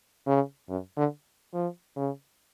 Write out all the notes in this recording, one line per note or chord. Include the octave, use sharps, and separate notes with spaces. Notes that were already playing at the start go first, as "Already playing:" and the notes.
C#3
F#2
D3
F3
C#3